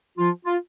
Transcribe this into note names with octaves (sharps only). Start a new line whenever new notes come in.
F3 F4
F4